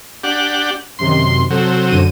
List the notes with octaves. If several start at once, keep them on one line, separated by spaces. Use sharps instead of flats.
D4 G4 F#5
F#2 C3 D#3 C6
C3 F#3 A4
F#2 D3 D#7